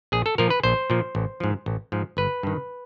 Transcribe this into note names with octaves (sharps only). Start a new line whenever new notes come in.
A#1 G#4
A4
A#2 F3 A#4
B4
A#1 C5
A#2 F3
A1
G#2 F3
A1
G#2 F3
G1 B4
G2 D#3